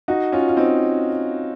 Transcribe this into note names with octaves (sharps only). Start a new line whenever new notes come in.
D#4 F#4
C#4 F4
F4
C4 D#4